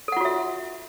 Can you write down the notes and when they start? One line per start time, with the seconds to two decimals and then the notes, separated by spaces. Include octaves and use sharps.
0.08 A4
0.12 F#5
0.17 F4
0.21 F#4
0.25 E5